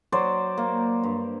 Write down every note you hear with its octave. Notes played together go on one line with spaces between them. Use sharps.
F#3 C5 D5
A#3
G2